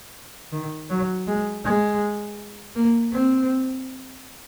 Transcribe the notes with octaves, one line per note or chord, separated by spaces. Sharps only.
D#3
F#3
G#3
G#3
A#3
C4